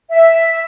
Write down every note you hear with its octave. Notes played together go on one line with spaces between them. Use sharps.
E5